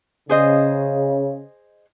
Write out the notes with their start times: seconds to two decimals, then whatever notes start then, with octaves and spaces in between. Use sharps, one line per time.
0.29 C#3 G#4 C5 D#5